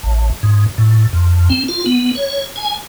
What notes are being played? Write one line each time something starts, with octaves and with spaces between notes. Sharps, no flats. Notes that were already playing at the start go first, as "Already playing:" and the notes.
A1
G#2
A2
F2
C4
F4
B3
C#5
G#5